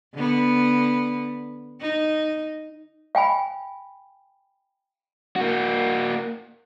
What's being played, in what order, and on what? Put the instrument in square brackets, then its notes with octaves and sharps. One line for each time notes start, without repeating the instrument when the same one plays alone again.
[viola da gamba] D3 B3
D#4
[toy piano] F5 G5 G#5 B5
[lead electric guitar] A#3 F#4